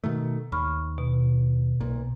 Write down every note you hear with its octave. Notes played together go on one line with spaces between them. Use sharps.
B2 D#3 A3
D#2 B5 C#6 F6
B2
B1 A#2